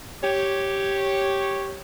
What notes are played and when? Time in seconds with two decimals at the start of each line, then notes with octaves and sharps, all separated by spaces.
0.23 G4 C#5